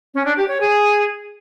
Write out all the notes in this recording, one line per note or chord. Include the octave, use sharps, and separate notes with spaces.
C#4
D4
G4
C#5
G#4